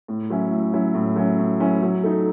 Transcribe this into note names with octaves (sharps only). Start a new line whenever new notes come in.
A2
F#3 C#4 E4
A2
F#3 C#4 E4
A2
F#3 C#4 E4
A2
F#3 C#4 E4
F#3
A3 D#4